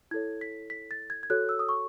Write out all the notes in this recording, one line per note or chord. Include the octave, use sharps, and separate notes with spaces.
E4 A4 C#5 G#6
B6
B6
A6
G#6
G#6
F#4 A4 C#5 F#6
E6
D#6
C#6